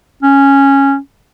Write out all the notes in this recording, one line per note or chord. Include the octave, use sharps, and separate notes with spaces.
C#4